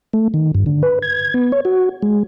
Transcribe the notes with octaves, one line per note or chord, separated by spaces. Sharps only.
A3
D#3
G2
D3
B4
G#6
B3
C#5
F#4
G#3